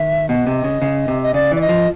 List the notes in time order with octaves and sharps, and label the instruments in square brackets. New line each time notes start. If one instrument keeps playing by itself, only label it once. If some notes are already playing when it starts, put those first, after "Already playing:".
Already playing: [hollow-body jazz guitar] D#3 [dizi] E5
[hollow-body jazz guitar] B2 [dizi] D#5
[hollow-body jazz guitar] C3
C#3
C#3
C3
[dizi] D#5
[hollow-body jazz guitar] C#3 [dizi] D5
[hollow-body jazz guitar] E3 [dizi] D5
[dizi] D#5
[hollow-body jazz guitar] F3